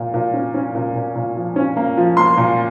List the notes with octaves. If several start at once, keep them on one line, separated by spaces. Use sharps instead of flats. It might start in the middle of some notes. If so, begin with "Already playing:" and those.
Already playing: A#2
A#2
C#4
C#4
A#2
A#2
A#2
F3
C#4
A#3
F3
A#3 C6
A#2